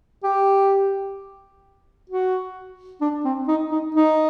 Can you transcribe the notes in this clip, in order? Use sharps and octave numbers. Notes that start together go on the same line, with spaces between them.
G4
F#4
D4
C4
D#4
D#4
D#4